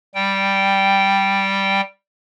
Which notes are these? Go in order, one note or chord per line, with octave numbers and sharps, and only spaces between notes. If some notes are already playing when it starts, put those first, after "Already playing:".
G3 G5